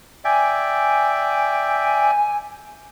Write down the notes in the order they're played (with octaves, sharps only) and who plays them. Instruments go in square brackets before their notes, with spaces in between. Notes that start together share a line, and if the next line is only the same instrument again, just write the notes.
[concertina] D5 E5 G5 [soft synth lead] G#5